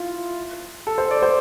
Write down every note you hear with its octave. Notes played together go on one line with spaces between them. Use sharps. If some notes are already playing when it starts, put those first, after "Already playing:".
Already playing: E4 F4
A4
C5
D5
C5